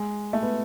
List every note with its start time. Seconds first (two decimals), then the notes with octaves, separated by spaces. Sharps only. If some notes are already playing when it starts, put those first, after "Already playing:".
Already playing: G#3
0.33 A3
0.42 B3